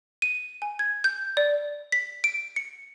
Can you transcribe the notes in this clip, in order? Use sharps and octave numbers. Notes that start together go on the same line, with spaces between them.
D#7
G#5
G#6
G6
D5
B6
D7
C#7